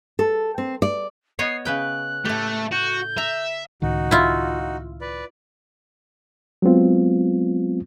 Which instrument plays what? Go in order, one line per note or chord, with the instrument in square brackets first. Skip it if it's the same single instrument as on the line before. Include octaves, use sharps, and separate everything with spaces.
[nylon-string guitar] A4
C4
D5
[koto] B3 C#5 D#5 [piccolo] C7
[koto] C#3 B4 G5 [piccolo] F#6
[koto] A2 G4 [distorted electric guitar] A3
[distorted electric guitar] F#4 [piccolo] G6
[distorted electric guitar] E5 [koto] A#5
[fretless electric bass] C#2 A2 D#3 [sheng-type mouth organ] D#4 F#4
[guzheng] E4 F4
[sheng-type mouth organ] B4 D5
[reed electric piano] F#3 G#3 B3 C4 F4